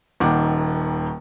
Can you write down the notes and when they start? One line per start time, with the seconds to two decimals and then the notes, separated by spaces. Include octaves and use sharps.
0.20 D#1 D#2 D#3 F#5 D6